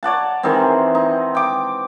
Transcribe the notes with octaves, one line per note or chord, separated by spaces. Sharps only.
C#5 D5 F#5 A5
D#3 E3 G#3 C4
D#4
G5 D6